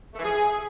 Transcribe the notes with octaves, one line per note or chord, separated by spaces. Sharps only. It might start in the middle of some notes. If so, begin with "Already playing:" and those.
A3
E3
G#4